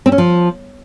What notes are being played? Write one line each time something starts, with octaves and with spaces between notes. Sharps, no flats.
C4
C#4
F3